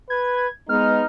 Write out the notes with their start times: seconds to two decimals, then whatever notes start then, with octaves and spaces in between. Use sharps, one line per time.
0.10 B4 G#6
0.69 G#3 B3 D#4 F6